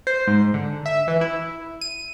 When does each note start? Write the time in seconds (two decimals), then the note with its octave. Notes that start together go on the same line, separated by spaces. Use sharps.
0.07 C5
0.27 G#2
0.54 D3
0.86 E5
1.08 E3
1.21 E4
1.81 D#7